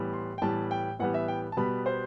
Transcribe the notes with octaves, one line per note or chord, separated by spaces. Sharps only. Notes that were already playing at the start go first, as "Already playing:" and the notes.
Already playing: A2 E3 G3 B3
C6
G5
A2 E3 G3 B3 A5
G5
A2 E3 G3 B3 F#5
E5
G5
A5
B2 G3 B3 B5
C5